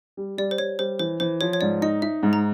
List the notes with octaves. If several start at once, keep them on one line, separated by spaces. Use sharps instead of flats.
G3
G3 D5
C5
G3 C#5
G3 C5
E3 C5
E3 C5
F3 C#5
C#5
G#2 D5
D#4 D#5
D#4 E5
G#2
A#5